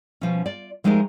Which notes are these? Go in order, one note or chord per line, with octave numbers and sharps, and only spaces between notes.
B2 F3 C#4
F4 D5
F3 G#3 A3 D#4 G4 A#4